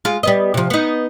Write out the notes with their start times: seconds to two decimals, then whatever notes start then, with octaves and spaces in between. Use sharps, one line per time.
0.05 G#3 F4
0.23 G3 B3 D#5
0.54 C3 F3
0.70 B3 D#4